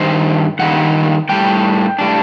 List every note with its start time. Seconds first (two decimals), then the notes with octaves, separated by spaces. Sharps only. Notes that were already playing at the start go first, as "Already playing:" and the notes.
Already playing: G2 D#3 C5
0.59 G2 D#3 G3 A#3 F#5
1.29 A2 G3 D4 G5
1.99 A2 G3 D4